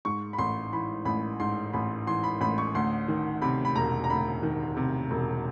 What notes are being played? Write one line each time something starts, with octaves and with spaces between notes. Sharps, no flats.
G#2 C#6
B5
A1 C6
E3 B5
A1 B5
G#2 C6
A1 B5
E3 C6
B5
A1 B5
C#6
D2 C6
D#3
C3 B5
B5
E1 A#5
A#5
D2 B5
D#3
C3
E1